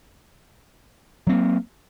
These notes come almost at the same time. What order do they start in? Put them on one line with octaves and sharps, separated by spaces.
F#3 C4 A#3